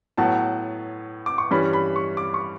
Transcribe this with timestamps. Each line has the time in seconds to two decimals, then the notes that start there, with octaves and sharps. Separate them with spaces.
0.17 A2 F#3 B3 A5
1.26 D6
1.38 C#6
1.51 G2 E3 G3 C#4 B5
1.73 B5
1.96 C#6
2.17 D6
2.34 C#6